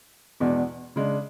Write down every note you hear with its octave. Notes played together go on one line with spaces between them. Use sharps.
E2 B2 G#3 D4
C#3 G#3 D4